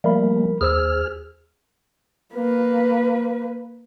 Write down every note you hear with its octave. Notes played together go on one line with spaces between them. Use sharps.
F3 G3 A3 A#3 A#4 B5
D#2 G#4 C5 E6 F6
A#3 B4